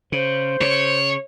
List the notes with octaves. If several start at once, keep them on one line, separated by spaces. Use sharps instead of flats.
C#3 C5
C#3 C#5